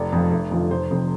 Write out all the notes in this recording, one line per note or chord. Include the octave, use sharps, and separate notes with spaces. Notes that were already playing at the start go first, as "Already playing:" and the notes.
Already playing: F1 D5
F2 F3
F1
F2 D3 F3
F1 C5
F2 C3